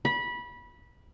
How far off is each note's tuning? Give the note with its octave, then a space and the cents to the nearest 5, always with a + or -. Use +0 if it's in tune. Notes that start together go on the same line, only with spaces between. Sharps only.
B5 -20